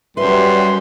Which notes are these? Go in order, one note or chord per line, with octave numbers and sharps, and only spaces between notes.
F#2 G3 B4 E5 C6